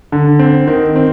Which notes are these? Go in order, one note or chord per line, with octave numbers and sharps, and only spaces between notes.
D3
C4
D#3
C4